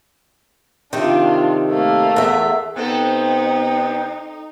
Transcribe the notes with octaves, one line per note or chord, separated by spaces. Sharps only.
C3 D#3 D4 F4
A3 A#3
E2 E5
C3 B3 C4 D#4 A4 G5